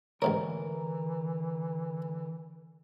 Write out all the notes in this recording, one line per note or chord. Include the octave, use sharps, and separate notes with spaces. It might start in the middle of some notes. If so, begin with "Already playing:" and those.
A1 G#2 D3 E3 A#4 C#5